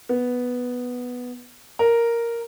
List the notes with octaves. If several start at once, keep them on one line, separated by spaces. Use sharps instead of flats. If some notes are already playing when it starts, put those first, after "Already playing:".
B3
A#4